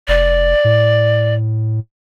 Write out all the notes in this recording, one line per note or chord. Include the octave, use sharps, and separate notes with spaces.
F1 D5
A2